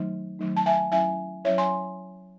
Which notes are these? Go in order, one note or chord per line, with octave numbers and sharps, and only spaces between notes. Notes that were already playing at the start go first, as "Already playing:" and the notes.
Already playing: D#3 F#3 A3 D#4
D#3 F#3 A3 D#4
A5
E5 G#5
F#3 C#4 E4 E5 G#5
F#3 C#4 E4 C#5 E5
G#5 C6